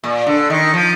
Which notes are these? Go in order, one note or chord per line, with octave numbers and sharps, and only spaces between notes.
A#2
D3
D#3
F3